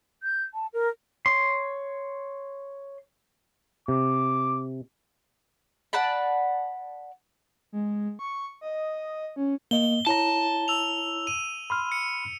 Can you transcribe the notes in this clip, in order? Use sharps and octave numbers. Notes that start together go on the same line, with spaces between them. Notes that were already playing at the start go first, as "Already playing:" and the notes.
G6
A5
A#4
C#5 C6
C3 D6
D5 F#5 A5 B5
G#3
C#6
D#5
C#4
A#3 D#5 G7
E4 C#5 A5 A#5
E6 F7
D#7
B5 C6 F6
C#7